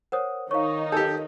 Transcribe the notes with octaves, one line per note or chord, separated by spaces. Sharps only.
A#4 C5 C#5 F#5 D#6
D#3 D#4 C#5 F5 C#6
G4 A4 G6